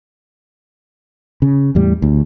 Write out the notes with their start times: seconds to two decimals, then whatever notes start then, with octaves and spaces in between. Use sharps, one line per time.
1.42 C#3
1.75 E2 A2 G3
2.02 D2